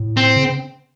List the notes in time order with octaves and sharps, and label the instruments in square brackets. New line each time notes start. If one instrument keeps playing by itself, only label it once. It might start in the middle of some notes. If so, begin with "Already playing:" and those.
Already playing: [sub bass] A2
[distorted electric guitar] C4
[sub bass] C#3